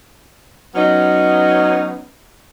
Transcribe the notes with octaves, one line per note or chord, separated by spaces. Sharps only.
F#3 B3 C#4 D#4